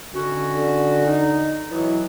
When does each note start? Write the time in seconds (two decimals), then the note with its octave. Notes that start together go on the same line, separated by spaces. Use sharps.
0.14 D3 D#3 C#4 F#4
1.06 D#4
1.71 B2 E3 F#3 E4